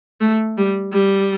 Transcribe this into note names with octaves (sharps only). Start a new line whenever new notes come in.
A3
G3
G3